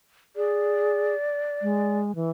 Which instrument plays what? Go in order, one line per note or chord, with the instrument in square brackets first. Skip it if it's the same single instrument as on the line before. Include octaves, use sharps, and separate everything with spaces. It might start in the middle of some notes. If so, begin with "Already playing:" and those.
[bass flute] G#4 [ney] D5
[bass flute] G#3
E3